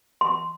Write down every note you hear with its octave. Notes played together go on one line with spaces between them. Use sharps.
C6